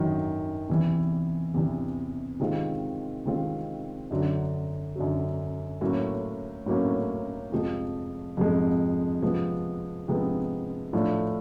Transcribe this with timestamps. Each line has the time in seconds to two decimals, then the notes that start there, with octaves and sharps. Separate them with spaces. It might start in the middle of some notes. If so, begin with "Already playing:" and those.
Already playing: F#2 D#3 F#3
0.69 E2 C3 E3
1.54 E2 C3 E3
2.40 C3 D#3 G#3 C4 F4
3.25 C3 D#3 G#3 C4 F4
4.11 F#2 D3 F#3
4.96 F#2 D3 F#3
5.81 A2 F#3 A#3 C#4
6.66 A2 F#3 A#3 C#4
7.52 F2 C3 F3 G#3
8.37 F2 C3 F3 G#3
9.22 C3 F3 G#3 B3
10.08 C3 F3 G#3 B3
10.93 A2 F3 A3 D4 F4